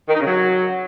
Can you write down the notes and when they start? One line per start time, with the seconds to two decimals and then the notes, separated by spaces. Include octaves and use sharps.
0.08 D#3
0.14 D#4
0.20 C#3
0.25 F#3